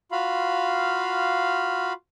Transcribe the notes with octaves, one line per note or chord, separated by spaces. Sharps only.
F4 F#4 F5 B5